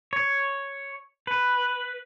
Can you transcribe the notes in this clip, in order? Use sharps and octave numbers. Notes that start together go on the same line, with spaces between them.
C#5
B4